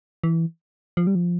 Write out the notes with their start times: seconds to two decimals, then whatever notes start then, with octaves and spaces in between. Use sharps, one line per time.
0.24 E3
0.97 F3
1.07 G3
1.15 F3